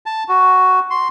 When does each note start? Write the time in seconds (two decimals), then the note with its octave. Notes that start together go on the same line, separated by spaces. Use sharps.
0.06 A5
0.28 F#4
0.91 C6